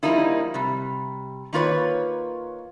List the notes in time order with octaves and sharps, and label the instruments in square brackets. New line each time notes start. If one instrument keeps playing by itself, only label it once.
[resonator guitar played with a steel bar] F3 G3 A#3 D#4 E4
C3 G3
D#3 A#3 F4 B4 C#5